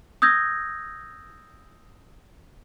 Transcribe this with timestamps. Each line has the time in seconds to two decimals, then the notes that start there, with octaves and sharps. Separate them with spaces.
0.22 D#6 E6 G6 G#6 A#6